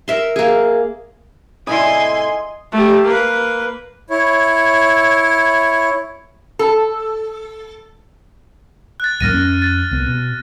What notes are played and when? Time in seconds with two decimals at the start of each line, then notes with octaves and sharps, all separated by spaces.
0.08 A#4 E5 C6
0.36 A#3 G#4
1.67 A2 C3 E4 D#5 G#5 C6
2.72 A3 G4
3.04 A#3 B4
4.10 E4 C#5
6.59 A4
9.00 F#6 A6
9.21 D1 F#2 A#3 F6 A#6 D#7
9.33 F2 C#4
9.62 A6
9.91 C2 B3
10.06 B2